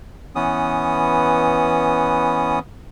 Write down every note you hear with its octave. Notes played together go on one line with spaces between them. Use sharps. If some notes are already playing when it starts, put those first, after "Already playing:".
E3 B3 C#4 D#6